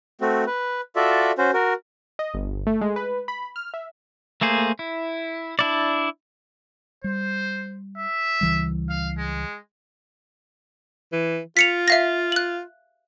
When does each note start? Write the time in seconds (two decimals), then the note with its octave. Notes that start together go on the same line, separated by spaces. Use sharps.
0.21 A3 C4 F#4
0.47 B4
0.96 F4 F#4 A4 D5 E5
1.38 C#4 F#4 C5
1.54 F#4 A#4
2.19 D#5
2.34 G1
2.67 A3
2.81 G#3
2.96 B4
3.28 B5
3.56 F6
3.74 E5
4.41 A3 A#3 G#4 C5
4.79 E4
5.59 D4 E4 D5
7.04 G3 C5
7.98 E5
8.41 C#2 E3 G3
8.89 F5
9.18 G#3
11.12 E3
11.57 F4 B6 C#7 F7
11.88 E5 F5 A#6
12.32 F#6 F#7